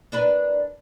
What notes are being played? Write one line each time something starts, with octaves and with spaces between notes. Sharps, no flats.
D4 A#4 B4